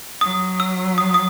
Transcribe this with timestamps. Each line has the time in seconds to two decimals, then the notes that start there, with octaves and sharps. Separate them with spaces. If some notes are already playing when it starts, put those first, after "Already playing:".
0.21 F#3 D#6
0.60 E6
0.98 D#6
1.14 D#6